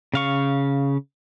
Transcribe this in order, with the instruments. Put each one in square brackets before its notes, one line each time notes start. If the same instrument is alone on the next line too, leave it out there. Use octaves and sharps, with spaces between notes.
[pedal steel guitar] C#3 F5 C#6